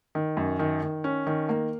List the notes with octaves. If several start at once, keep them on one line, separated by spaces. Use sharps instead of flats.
D#3
F#2
D#3
D#3
C#4
D#3
A#3